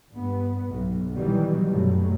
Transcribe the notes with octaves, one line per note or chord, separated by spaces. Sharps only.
G2 B3
B1
B2 D#3 E3 F#3 G3
F#2 B2 F#3 A3